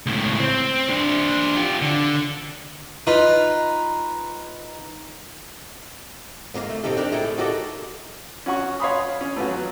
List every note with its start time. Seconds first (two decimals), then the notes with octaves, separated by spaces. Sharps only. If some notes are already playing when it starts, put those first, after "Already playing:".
0.06 C#2 A2
0.40 C4
0.90 D4 C5
1.56 F4 G4
1.82 D3
3.07 D#4 F4 B4
6.54 G#2 A#3 A4 F5
6.69 A3
6.84 A#2 C4 D#4 G4 A4
6.97 C4 D4 D#4 G4 A#4
7.12 A2 E4 G#4 A4 G5
7.38 D#4 F#4 G4 A4 A#4 D5
8.46 C#4 F#4 F#5 C#6
8.80 C#5 F5 F#5 B5 C6 D#6
9.21 C#4
9.36 A3 B3 C#4 F4 F#4
9.49 F#3